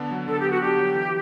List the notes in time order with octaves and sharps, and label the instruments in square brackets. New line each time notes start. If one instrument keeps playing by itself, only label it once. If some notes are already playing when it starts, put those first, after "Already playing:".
Already playing: [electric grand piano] D3 B3 D4
F#3
[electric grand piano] D3 [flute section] A4
[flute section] G4
[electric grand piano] B3 [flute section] F#4
[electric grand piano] D4 [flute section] G4
[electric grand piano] F#3
E3